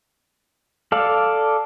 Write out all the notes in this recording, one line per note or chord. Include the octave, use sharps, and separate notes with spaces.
A4 D5 F5